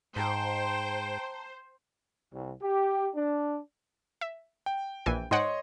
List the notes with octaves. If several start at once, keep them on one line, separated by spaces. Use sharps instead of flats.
G#2 C5 G5 A5 A#5 C6
C2
G4
D4
E5
G5
A#1 E3 G#5
G#2 C#5 D#5 F#5 G5 C6